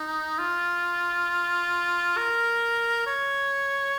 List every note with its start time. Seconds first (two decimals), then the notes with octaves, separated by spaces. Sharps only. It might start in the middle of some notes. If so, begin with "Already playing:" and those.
Already playing: D#4
0.39 F4
2.17 A#4
3.07 C#5